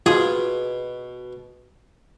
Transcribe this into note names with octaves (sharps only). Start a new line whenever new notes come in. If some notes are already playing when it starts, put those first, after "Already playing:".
B2 F4 G#4